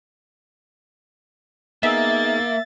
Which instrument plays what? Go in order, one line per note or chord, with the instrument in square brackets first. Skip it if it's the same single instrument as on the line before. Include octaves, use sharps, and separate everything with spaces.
[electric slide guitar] A#3 [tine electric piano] B3 D#4 G#4 [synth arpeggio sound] E5 [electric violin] A6